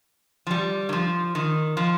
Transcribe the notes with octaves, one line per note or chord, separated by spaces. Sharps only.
F3
G3
D#3
F3
D#3
F3